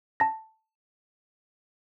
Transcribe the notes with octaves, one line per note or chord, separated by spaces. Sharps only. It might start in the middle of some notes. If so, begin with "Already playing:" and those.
A5 A#6